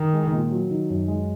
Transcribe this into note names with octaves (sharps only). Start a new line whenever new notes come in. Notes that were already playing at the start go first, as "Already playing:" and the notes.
Already playing: D#3
G#3
A#2
F#3
D#3
F#2
G#3